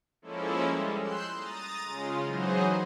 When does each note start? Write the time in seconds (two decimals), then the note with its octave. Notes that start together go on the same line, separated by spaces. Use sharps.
0.22 F3 G#3 A#3 C#4 E4 A4
0.67 G3 G#3
1.00 C6 E6 F#6 G6
1.34 A#5 D#6 A6
1.84 C#3 G#3 F4
2.23 E3 F#3 D#4 G#4 C5 D#5